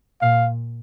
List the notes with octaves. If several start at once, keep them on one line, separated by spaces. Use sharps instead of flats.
A#2 F5